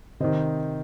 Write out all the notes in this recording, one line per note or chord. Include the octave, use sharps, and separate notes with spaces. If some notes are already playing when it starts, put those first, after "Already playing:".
C3 D#3 C5 D#5